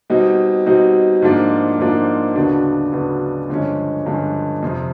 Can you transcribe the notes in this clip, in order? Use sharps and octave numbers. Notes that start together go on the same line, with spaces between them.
B2 G3 C4 D#4 F#4
B2 G3 C4 D#4 F#4
G#2 F3 A#3 D4 F4
G#2 F3 A#3 D4 F4
D2 C#3 F#3 B3 D4
D2 C#3 F#3 B3 D4
G2 D3 F3 G#3 C#4
G2 D3 F3 G#3 C#4
F2 C3 F3